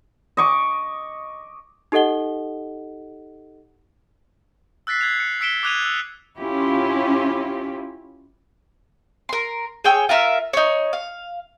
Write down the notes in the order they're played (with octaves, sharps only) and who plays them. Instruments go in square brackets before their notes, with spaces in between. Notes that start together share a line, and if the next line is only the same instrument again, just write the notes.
[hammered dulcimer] D#5 C#6 D6
[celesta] D#4 G4 A4 D#5 F#5 G7
[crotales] E6 F#6 A6 B6 C7
E6 G#6 C7 F7
C#7
E6 B6 C#7 D7 E7 G7
D6 D#6 F#6 G#6 D#7 F7
E6
[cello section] C#4 E4 F4 G4
[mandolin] A#4 C6
G#4 C#5 G5 E6
F4 A#4 E5 F6
D#4 C#5
F5